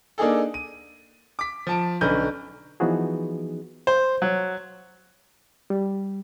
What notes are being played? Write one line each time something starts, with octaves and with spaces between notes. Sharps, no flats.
A#3 D4 D#4 G#4 A4
D#7
D6 B6
F3 A5 D7
B1 D3 C#4 B4 G6
E3 F3 B3 D#4 F#4 G#4
C5
F#3
G3